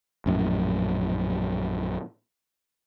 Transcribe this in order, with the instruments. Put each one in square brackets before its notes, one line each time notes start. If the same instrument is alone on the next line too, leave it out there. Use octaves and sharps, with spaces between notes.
[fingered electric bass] A#1 F#2 A2